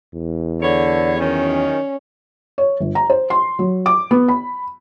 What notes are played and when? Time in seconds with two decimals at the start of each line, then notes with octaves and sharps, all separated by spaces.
0.14 E2
0.62 D3 A4 B4 C#5
1.20 F#2 D#3 C#4
2.58 C#5
2.80 G1
2.95 A#5
3.10 C5
3.30 C6
3.59 F#3
3.86 D6
4.11 B3
4.28 B5